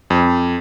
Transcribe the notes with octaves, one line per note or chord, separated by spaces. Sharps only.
F2